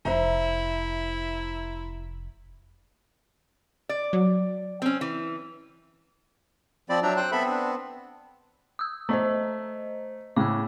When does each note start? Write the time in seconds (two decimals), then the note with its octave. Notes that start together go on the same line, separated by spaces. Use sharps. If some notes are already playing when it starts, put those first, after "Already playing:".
0.05 F1 E4 C5 E5 A#5
3.89 D5
4.13 F#3
4.82 C4 C#4
5.01 E3
6.89 F3 C4 D5 B5
7.03 F#3 D4 E5 G5 A#5
7.17 C5 G5 F#6
7.32 B3 C4 A4 E5 B5
7.50 D4
8.79 D#6 E6
9.09 A3 C5 D#5 A#5
10.36 A2 C#3 D6 E6